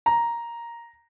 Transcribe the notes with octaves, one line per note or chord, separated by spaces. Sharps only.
A#5